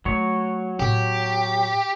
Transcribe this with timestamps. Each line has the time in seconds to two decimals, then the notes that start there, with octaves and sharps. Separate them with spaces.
0.05 F#3 A3 C#5
0.80 A2 B3 G4